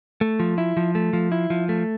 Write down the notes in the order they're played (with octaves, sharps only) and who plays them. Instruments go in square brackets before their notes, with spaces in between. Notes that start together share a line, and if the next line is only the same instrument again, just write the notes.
[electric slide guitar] A3
F3
E4
F3
A3
F3
E4
F3
A3